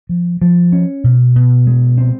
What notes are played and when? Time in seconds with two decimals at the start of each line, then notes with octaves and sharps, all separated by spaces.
0.09 F3
0.41 F3
0.72 C#4
1.04 B2
1.36 B2
1.67 G#3
1.98 C4